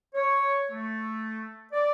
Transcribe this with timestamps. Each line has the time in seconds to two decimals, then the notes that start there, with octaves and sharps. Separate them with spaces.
0.14 C#5
0.72 A3
1.72 D5